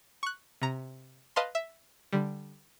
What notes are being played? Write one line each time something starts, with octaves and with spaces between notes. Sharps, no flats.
C#6 F#6
C3 A#5
B4 D#5 F5 A5 C6
E5
D3 G3